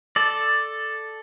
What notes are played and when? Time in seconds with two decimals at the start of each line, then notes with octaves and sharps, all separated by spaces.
0.16 A4 D5